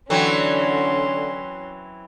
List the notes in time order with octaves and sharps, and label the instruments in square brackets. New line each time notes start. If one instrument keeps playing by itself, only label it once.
[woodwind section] D3 [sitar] E3 F#3 C4 [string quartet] C#4 C6